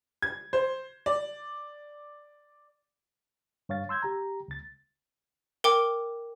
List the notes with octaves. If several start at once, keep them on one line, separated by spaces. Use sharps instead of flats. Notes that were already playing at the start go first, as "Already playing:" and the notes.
G#6
C5
D5
G2 C#5 F5 A6
C6 E6 G6 G#6
G4 A#5
C#2 A6
A#4 G5 D6